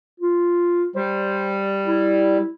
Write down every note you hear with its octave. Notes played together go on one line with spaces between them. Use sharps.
F4
G3 C5
E4